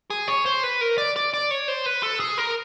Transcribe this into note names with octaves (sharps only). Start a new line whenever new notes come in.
G#4
C#5
C5
B4
A#4
D5
D5
D5
C#5
C5
B4
A4
G#4
A#4